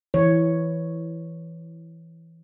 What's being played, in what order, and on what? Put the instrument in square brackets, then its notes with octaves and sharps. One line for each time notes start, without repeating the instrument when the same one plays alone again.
[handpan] E3 C#5